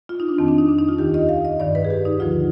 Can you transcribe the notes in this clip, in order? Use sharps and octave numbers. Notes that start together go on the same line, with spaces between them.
F4
D#4
D4
F2 D#3 C4
D4
D#4
D4
D#4
F4
D#2 D#3 G4
D#5
F5
D#5
G2 D#3 D5
B4
G#4
G4
D#4
D2 D3 F3 F4